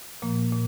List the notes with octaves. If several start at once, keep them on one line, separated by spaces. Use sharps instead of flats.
A#2 F3 A#3
A#2